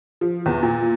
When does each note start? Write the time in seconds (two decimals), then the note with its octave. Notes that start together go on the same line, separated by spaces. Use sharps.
0.21 F3
0.46 E2
0.63 A#2